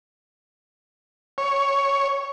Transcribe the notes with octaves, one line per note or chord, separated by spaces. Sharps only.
C#5